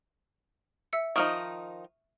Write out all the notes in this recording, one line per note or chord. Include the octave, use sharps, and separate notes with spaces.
E5 E6 C#7
D#3 F3 D#4 C#6 D#6 F6